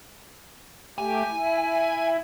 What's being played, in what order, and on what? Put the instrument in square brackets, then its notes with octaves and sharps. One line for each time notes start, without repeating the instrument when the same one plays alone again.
[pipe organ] A3 G4 [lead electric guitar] G#5
[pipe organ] E4